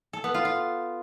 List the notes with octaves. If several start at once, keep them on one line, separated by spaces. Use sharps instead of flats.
A4
B3
F4
F4